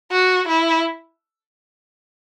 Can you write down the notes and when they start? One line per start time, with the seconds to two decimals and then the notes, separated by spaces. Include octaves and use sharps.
0.11 F#4
0.48 E4